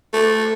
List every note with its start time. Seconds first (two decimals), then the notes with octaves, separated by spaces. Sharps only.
0.13 A3